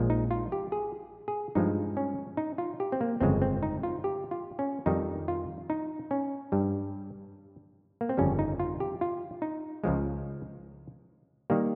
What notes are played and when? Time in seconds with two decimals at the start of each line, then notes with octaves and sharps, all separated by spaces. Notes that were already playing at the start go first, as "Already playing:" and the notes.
Already playing: A#1 A#2 F3 G#3
0.10 D#4
0.31 F4
0.52 G4
0.72 G#4
1.28 G#4
1.55 G2 F3 G#3 D#4
1.97 C#4
2.37 D#4
2.58 F4
2.80 G4
2.92 C4
3.01 A#3
3.21 G1 F2 C#3 G#3 C4
3.42 C4
3.63 D#4
3.83 F4
4.04 G4
4.31 F4
4.59 C#4
4.86 F2 D#3 G3 D#4
5.28 F4
5.70 D#4
6.11 C#4
6.52 G2 G3
8.01 A#3
8.09 C4
8.17 G1 F2 C#3 G3 C#4
8.39 D#4
8.60 F4
8.80 G4
9.01 F4
9.42 D#4
9.84 C#2 C#3 F3 G#3
11.50 D#3 G3 A#3